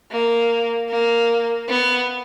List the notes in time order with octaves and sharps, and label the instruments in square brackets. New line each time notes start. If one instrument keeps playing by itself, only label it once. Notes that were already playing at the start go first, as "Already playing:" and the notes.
[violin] A#3
A#3
B3